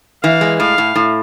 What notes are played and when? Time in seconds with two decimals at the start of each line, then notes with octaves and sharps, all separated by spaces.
0.23 E3 F5
0.41 G#3
0.59 A2 F5
0.78 A2
0.96 A2